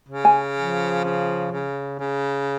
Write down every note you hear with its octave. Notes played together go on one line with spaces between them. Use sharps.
C#3
G#5
F3
C#3
C#3
C#3